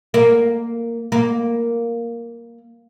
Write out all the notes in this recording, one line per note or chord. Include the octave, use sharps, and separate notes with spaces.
A#3
A#3